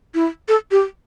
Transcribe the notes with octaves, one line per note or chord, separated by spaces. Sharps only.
E4
A4
G4